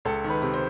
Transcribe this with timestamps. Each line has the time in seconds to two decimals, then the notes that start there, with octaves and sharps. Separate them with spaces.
0.05 C#2 A4
0.24 D#3
0.30 B4
0.42 C3
0.54 C5